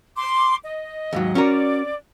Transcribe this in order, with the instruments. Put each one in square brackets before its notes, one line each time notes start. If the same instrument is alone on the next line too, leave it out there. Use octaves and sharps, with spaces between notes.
[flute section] C6 D6
D#5
[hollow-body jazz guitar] D#2 G#2 F#3
[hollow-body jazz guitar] C#4 F#4 A#4 [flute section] D5